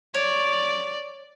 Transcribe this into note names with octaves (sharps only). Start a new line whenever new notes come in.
C#5 D5